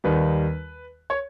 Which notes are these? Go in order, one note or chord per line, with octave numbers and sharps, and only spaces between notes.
D#2 D#3 G3 B4
C#5